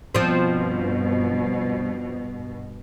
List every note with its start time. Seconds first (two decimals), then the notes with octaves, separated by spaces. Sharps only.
0.15 G2 B2 F3 C4